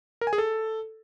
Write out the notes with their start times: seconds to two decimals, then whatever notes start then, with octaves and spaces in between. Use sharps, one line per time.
0.21 A#4
0.27 G#5
0.33 G#4
0.38 A4